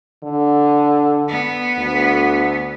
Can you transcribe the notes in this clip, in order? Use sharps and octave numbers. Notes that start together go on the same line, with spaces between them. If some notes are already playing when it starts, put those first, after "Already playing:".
D3
B3
D2